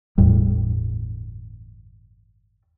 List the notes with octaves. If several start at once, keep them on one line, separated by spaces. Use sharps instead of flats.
G1 E2 A2 G3